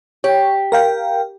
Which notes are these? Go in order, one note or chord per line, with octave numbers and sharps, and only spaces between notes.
G4 C#5
A#4 F5 G5